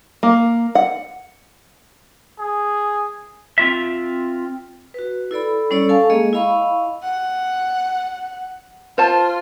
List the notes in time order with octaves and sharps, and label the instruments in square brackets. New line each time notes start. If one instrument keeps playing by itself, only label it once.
[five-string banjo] A#3
F#5
[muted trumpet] G#4
[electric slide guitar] C4 F4 E5
[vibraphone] F#4 B4
E4 A4 D5 B5
G3 C#4 A4 C#5 D5 E6
A4 F5 G#5 A5 C#6
G#3 A#3 G#4 D#5
E4 D#5 F5 B5 C#6
[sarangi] F#5
[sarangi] F4 [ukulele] C5 A5